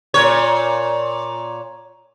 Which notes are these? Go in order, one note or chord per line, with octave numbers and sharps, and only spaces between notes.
A#2 C#5